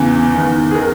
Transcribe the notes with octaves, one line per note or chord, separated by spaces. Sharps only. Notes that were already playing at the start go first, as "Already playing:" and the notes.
Already playing: E2 C#3 E3
E2 D#3
G#4
D#3 A#4